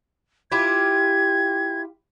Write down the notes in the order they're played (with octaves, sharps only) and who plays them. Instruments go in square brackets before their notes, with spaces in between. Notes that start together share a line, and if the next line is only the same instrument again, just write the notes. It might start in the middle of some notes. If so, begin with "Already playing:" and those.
[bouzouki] E4 F4 G4 [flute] G#6